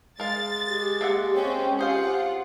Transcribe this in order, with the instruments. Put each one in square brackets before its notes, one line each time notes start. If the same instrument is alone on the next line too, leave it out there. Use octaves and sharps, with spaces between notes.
[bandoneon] G#3 [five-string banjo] A#4 F5 [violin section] A6
[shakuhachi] G4
[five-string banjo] A#3 E5 F#5
[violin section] C4 C#4 [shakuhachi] G5
[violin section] F4 F#5 [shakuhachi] G4 [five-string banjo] G#4 C5 F5